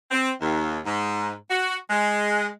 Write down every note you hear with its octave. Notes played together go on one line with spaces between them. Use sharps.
C4
D#2
G#2
F#4
G#3